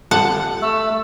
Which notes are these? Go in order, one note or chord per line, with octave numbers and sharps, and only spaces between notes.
G3 F4 A4 F#5
A3 E6